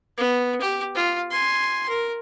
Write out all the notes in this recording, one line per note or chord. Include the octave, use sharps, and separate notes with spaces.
B3
G4
F4
G#5 C6
A#4